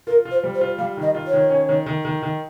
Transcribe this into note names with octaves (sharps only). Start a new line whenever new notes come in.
F4 A#4
F4
C5
G3
C5
F4
G3 F5
D#3
D#5
F4
C#5
D#3
C#4
D#3
D#3
D#3
D#3